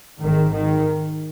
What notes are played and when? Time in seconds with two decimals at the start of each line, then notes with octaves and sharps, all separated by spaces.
0.21 G#1 G#2 D#3
0.52 D#3